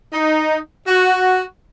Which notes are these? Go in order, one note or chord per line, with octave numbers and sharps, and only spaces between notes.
D#4
F#4